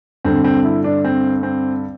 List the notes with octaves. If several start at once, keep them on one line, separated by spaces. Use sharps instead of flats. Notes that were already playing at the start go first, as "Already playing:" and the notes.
G2 D3 C4
C4
E4
D4
C4
C4